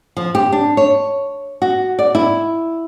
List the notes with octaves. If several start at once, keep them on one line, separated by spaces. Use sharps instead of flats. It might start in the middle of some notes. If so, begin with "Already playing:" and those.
F3
G4
D4
C#5
F#4
D5
E4